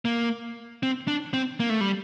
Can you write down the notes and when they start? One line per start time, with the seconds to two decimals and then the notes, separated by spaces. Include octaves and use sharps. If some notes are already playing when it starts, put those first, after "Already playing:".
0.05 A#3
0.83 C4
1.08 D4
1.34 C4
1.60 A#3
1.70 A3
1.81 G3